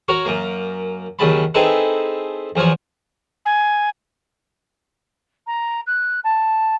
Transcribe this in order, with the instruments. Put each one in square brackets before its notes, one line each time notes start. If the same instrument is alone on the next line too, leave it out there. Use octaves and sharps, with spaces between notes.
[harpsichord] F#4 A#4 C#5
F#2 A#3
D#2 C#3 F#3 A5 B5
C4 D#4 E4 G#4 A4 B4
E2 F3 F#3 G#5
[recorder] G#5
[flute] A#5
F#6
A5